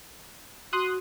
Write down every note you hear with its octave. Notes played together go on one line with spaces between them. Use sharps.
F#4 C6 D#6 F#6